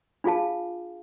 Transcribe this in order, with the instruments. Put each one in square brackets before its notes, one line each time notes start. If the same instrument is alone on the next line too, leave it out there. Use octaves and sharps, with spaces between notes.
[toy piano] D4 F4 G#4 F5 A5